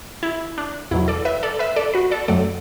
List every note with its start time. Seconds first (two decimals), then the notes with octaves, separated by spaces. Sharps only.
0.23 E4
0.58 D4
0.91 E2 B2 F#3 E4
1.08 A4 D5
1.25 B4 E5
1.43 A4 D5
1.59 B4 E5
1.76 A4 D5
1.94 F#4 B4
2.11 A4 D5
2.28 F#2 F#3 A3 A4 D5